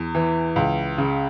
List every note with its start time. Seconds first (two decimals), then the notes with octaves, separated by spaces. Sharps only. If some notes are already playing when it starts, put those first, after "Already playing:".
Already playing: E2
0.15 E3
0.56 C#2
0.98 C#3